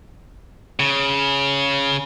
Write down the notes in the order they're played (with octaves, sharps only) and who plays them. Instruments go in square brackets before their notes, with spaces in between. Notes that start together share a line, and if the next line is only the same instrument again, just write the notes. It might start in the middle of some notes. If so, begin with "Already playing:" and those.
[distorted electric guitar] C#3